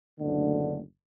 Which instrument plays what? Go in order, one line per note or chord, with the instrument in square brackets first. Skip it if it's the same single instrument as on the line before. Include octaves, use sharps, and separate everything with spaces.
[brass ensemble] F#1 D2 B2 D3 A3